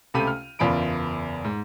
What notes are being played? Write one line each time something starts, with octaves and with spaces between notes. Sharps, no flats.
C#2 C3 A3 G4 B5 D#7
F6
F#1 E2 F4 B5 D7
G#2